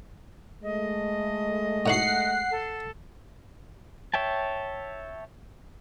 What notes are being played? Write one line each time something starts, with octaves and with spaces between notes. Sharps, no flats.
G#3 A3 D#5
A2 D#4 F#4 F#5 C7
A4
C#5 E5 G5 A5